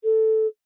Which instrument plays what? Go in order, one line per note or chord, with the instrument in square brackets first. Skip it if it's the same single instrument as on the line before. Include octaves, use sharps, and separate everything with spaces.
[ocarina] A4